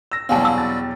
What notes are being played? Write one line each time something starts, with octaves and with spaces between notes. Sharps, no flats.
E6 A#6
E2 B2 F#3 G3 C4 F5 G#5 A5
E6
A6